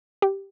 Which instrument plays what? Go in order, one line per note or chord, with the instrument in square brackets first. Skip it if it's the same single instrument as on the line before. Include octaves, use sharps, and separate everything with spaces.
[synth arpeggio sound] G4